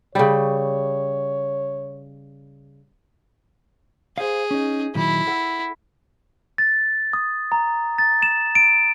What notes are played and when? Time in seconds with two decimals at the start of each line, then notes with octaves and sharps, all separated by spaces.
0.15 C#3 G3 C#5
4.18 G#4 C5 F5
4.51 C#4 D#4
4.95 A#2 D#3 F#3 E4
5.27 A4 F#5
6.58 A6
7.13 D#6
7.52 A#5
7.98 A6
8.22 E7
8.55 D7